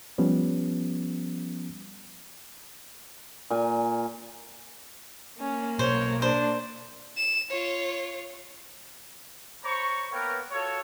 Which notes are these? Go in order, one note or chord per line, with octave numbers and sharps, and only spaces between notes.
F3 G3 B3 C#4
A#2 G#5
A#3 C#4
B1 C5 C#5
D4 C5
E7
F4 C#5
C5 C#5 A#5 B5 C#6
A#3 B3 A#4 B4 C#5 G5
F4 F#4 A4 C#5